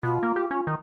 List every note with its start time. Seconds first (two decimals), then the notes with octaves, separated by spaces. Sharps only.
0.03 B2 F4
0.23 A#3
0.36 G4
0.51 C#4
0.67 D#3